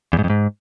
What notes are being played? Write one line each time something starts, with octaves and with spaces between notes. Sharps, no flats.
E2
G#2
F2
G#2